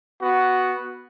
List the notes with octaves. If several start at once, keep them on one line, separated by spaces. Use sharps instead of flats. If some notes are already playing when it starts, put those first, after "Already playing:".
B3 F#4